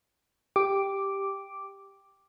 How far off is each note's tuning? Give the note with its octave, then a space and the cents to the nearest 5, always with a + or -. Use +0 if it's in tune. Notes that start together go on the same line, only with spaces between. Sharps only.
G4 +0 D6 +0